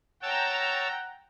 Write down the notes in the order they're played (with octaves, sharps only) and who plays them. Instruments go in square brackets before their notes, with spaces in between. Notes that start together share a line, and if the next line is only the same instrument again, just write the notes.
[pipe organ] C#5 A5 E6 [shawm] F#5 [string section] G5 A#5